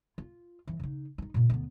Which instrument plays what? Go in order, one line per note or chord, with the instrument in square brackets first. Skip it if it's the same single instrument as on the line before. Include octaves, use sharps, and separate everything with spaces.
[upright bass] F4
E3
C#3 D#4
D#4 E4
A#2 C#3
D2 B3